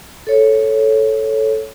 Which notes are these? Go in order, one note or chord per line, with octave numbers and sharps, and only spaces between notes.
A4 C#5